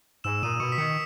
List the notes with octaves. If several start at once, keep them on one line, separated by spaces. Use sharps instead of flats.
G#2 E6 E7
A#2 D#6 D#7
B2 C#6 C#7
B6
D#3 C#6 C#7